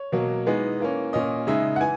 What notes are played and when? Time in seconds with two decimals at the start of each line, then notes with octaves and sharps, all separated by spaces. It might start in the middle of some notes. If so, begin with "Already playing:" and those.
Already playing: C#5
0.12 B2 F#3 A#3
0.46 E3 G#3 B3 D#4
0.80 E3 A#3 C#4
1.13 A#2 A#3 C#4 D#5
1.47 C#3 G#3 D#4 E5
1.76 F#5
1.80 E3 G#5